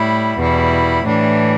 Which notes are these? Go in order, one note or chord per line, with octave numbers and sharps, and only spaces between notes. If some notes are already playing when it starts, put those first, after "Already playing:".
Already playing: A2 G3 E4
E2 B2 G3 E4
A2 E3 G3 D4